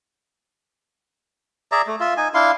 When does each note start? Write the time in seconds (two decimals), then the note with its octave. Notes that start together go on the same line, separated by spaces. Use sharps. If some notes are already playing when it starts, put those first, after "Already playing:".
1.72 G#4 D5 E5 A#5
1.87 A3
2.00 F4 E5
2.17 D#4 G#5
2.34 D4 E4 F5 C6